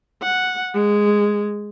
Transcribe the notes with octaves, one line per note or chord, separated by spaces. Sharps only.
F#5
G#3